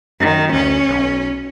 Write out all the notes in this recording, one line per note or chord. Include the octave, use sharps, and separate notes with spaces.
F#2 D#3
D2 C#4
B1